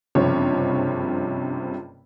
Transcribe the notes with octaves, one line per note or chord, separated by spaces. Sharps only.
F#1 G2 C3 F3 C#5